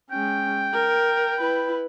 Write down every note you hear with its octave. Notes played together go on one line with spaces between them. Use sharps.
G#3 C#4 G5
A#4
E4 B4